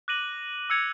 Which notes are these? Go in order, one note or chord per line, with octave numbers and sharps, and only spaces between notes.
D6 F#6 A#6 D#7 F#7
E6 G#6 C#7 F7